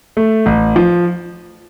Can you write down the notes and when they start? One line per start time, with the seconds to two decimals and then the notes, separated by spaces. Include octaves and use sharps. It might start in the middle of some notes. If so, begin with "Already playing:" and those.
0.17 A3
0.46 A1
0.76 F3